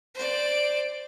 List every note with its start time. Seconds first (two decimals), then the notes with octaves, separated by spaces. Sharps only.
0.14 C5 D5